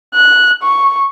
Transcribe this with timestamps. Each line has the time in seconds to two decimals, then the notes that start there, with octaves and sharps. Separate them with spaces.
0.15 F#6
0.63 C#6